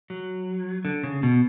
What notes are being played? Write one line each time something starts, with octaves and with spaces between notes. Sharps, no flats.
F#3
D3
C#3
B2